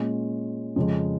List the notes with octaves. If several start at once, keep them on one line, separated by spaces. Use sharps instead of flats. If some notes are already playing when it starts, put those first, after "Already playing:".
Already playing: A#2 G#3 C#4
F2 C#3 G#3